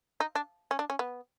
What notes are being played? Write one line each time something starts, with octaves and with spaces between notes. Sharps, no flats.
D#4
D4
C#4
D4
C#4
B3